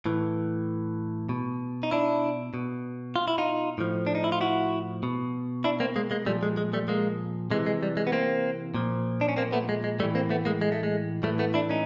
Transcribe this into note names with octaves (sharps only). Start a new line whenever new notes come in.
A2 E3
B2
D#4
D4 E4
B2
F4
E4
D#4 F4
A2 F3
D4
D#4
E4
F4
E4 F#4
B2
D4 E4
A#3 C4
G#3 A#3
G#3 A#3
A#2 F3 G3 A3
G#3
G#3
G3 A3
G#3 A#3
C3 E3 G#3
G#3
G3
G#3
B3
A#3 C4
A#2 F3
D4
C#4
A#3 C4
A3 B3
G#3
G#3
A2 E3 G3 A3
A#3 C4
A3 B3
G#3 A#3
G#3
A3
G#3
A2 E3 G3 A3
A3 B3
D4 E4
C#4 D#4